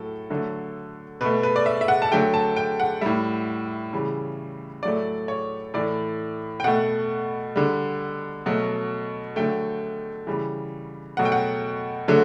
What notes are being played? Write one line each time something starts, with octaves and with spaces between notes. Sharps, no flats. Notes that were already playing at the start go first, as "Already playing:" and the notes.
Already playing: A2 F#3 A4
D3 F#3 A3
B2 A3 B4
B4
D5
E5
E5
F#5
A5
D3 F#3 A3 G5
A5
G5
F#5
A2 G3 E5
C#3 E3 G3
A2 F#3 A3 D5
C#5
A2 E3 A3 D5
G5
B2 A3 F#5
D3 G3
B2 F#3 A3
D3 F#3 A3 G5
C#3 E3 G3
B2 F#3 A3 F#5
G5
F#5
D3 F#3 A3